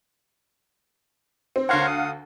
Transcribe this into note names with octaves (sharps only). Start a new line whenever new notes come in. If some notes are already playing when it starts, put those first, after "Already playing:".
C4
D2 A#4 C5 C#5 F5 F#5
D#6